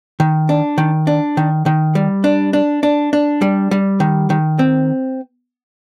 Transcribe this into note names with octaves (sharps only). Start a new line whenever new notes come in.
D#3
D4
D#3
D4
D#3
D#3
G3
D4
D4
D4
D4
G3
G3
D#3
D#3
C4